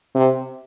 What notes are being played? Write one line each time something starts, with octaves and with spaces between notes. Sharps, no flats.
C3